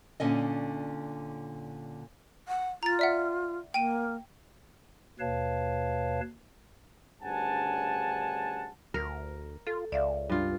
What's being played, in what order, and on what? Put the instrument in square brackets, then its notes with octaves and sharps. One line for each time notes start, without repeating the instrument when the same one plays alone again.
[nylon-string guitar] A#2 D3 C#4 D#5
[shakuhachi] F#5
[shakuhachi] F4 [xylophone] A#5 A6
[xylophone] D5 E5 F#5
[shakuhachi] A#3 [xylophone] G5 D#7
[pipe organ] D#2 B2 B4 C#5 F5 A5
[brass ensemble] D2 G2 C#3 F#5 G#5 A5
[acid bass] D2 [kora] A#4
[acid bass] F4 [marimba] A4
[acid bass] C#2 [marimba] D5 E5 F5
[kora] G2 F4